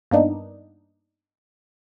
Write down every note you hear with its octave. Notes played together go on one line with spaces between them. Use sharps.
G2 A#3 B3 D4 D#4